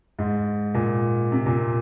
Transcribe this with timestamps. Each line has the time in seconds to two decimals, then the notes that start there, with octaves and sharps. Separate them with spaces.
0.19 G#2
0.74 A#2
1.32 C3
1.46 A#2